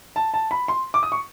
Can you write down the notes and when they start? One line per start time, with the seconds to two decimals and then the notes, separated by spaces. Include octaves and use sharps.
0.16 A5
0.34 A5
0.51 B5
0.68 C6
0.94 D6
1.03 D#6
1.12 C#6